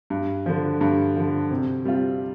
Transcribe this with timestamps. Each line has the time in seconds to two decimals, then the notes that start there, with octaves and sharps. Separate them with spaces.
0.10 G2
0.46 D3 F3
0.81 G2
1.16 D3 F3
1.51 C3
1.85 G3 C4 F4